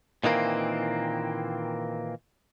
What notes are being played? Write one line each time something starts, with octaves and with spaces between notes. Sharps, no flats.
A#2 D#3 E3 A#3 C4